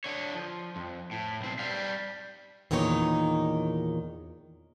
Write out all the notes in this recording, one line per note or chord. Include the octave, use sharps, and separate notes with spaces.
D3 C#5
F3
F2
A2
B1 C4
G3 F5
E2 A#2 D#3 D#4 G4 C#5